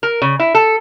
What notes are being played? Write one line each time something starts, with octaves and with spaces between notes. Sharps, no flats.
A#4
C#3
E4
A4